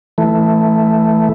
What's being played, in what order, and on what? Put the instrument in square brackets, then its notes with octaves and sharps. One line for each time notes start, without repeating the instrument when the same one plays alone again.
[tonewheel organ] E3 A3